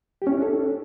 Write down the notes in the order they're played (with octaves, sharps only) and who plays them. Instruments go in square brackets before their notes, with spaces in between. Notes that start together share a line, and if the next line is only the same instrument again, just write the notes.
[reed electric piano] G4
C#4
E4
D4
A4